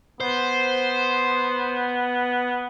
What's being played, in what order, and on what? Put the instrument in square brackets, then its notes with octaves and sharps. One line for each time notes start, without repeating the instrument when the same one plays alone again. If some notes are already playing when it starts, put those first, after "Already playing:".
[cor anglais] B3 [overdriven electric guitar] C5